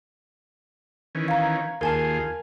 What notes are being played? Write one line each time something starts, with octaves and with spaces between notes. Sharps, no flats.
D#3 E3 C#4
F5 A#5
D#2 F4 G#4 A#4 G#5 A5